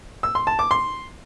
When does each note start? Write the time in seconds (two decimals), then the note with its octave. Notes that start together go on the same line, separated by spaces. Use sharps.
0.23 E6
0.35 C6
0.47 A5
0.59 D6
0.71 C6